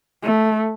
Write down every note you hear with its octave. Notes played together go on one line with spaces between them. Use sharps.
A3